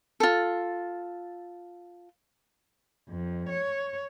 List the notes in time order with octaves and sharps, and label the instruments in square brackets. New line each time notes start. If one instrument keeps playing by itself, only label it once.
[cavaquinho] F4 A4
[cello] F2
C#5